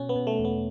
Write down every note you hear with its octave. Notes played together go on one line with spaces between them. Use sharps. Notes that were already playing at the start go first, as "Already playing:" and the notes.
Already playing: B2 C#4
B3
B2
A3
E2
B3